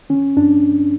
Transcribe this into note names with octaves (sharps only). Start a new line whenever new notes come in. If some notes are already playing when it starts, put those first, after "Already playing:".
D3 C#4
G2 D4